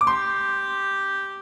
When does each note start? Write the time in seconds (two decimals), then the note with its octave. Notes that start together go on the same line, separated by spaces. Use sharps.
0.01 D6
0.07 G4 C6